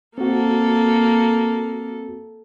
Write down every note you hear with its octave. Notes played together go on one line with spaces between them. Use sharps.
A#3 C4 F#4 A4